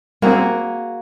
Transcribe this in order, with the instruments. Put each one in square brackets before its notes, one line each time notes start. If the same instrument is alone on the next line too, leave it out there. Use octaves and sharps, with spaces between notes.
[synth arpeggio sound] G3 C4 [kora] A#3 F#4 G#4